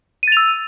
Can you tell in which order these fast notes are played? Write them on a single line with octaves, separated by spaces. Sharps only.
D#7 A6 F7 E6